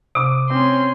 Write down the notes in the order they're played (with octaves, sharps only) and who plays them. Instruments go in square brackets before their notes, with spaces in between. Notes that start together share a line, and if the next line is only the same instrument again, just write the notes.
[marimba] C3 [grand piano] D6 D#6
[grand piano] C4 [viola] C#4 C6